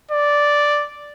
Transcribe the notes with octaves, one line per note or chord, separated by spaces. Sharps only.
D5